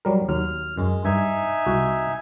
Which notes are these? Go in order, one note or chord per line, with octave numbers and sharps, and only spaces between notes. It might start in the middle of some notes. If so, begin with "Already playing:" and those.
F#3 G3 A#4
D#2 F#3 F6
F#2 G#3
G2 D#4 E5 G#5
C2 F#4